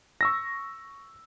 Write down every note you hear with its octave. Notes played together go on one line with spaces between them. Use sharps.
C#6 E6 A#6